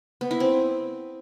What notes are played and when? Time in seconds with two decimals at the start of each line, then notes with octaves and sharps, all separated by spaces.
0.21 B3
0.31 E4
0.40 C4